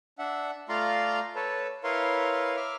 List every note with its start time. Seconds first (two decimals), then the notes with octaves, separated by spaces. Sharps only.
0.19 D4 E5 F#5
0.69 A3 F4 D5 F5 A#5 C6
1.36 A4 B4 C#5 A5
1.84 E4 A#4 B4 C#5 F5 C6
2.57 E5 D6 F6